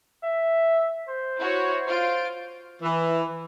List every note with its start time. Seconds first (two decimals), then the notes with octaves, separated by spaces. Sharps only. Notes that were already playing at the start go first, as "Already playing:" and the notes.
0.23 E5
1.08 C5
1.39 E4 F#4 C#5
1.88 F4 C5 C6 D7
2.82 E3